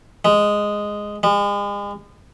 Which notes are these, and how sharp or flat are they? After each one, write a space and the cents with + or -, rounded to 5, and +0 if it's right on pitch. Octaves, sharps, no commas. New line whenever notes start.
G#3 -5
G#3 -40